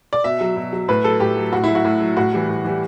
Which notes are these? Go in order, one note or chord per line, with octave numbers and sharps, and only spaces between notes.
D5
B2 E5
F#3
B2
F#3
A2 B4
F#3 A4
A2 G4
F#3
A2 F#4
F#3 E4
F#4
A2
F#3
A2 F#4
E3 G3
A2
E3 G3